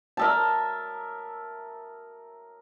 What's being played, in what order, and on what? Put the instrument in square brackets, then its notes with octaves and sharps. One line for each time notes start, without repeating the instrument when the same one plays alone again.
[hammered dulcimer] A#4 E5 A5